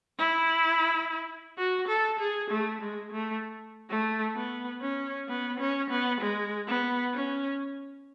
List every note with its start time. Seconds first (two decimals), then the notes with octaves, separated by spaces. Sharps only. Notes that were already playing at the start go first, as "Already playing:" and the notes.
0.18 E4
1.58 F#4
1.88 A4
2.19 G#4
2.50 A3
2.81 G#3
3.12 A3
3.89 A3
4.35 B3
4.81 C#4
5.29 B3
5.59 C#4
5.90 B3
6.21 G#3
6.68 B3
7.14 C#4